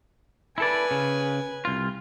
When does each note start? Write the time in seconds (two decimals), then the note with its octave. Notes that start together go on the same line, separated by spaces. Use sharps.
0.58 E4 A4 B4 D5 G#5
0.91 C#3
1.65 C2 F4